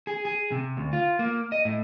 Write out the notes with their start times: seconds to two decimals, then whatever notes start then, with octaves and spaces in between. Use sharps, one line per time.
0.07 G#4
0.25 G#4
0.52 C3
0.77 D2
0.93 F4
1.19 A#3
1.52 D#5
1.65 A2